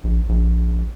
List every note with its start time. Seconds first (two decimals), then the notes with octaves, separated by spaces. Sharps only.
0.04 A#1
0.29 A#1